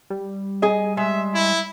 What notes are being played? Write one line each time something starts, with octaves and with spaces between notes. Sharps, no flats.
G3
G#4 D#5
G#3 E5
E4